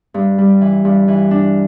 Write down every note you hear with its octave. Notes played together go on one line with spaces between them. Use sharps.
G2
G3
E3
G2
E3
D4